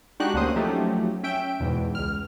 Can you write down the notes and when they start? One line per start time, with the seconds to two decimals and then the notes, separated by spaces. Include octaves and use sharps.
0.20 G#3 D4 D#4 F#4 G4 F#6
0.34 D2 D3 A#3 C#4 C5 D#6
0.56 F3 F#3 A3 C#4 D#4 G4
1.23 C#4 E5 G5 D7
1.60 E2 G#2 B2
1.95 C#2 F6